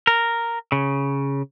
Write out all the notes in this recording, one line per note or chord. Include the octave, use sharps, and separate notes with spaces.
A#4
C#3